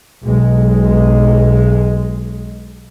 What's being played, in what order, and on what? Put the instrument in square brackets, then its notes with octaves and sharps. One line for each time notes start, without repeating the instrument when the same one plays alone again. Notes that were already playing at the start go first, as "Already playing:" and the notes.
[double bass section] B1 G#3